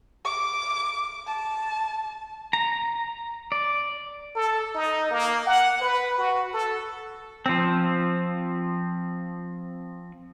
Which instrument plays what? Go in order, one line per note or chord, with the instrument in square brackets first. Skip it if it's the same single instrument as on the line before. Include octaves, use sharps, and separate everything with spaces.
[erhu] D6
A5
[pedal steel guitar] A#5
D5
[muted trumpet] A4
D#4
A#3
F#5
B4
F#4
A4
[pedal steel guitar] F3 C4